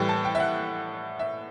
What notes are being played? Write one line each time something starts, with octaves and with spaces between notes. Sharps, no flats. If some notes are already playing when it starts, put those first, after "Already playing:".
Already playing: A2 E3 G3 G5
A5
G5
E5
F#5
E5